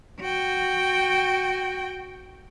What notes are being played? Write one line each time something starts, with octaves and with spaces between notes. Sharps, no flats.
F#4 G5